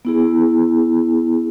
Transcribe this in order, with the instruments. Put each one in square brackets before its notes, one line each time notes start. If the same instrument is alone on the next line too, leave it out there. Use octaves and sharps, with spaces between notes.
[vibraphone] B3 E4 G#4